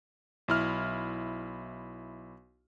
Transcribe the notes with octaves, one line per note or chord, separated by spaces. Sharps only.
B1 E4 F6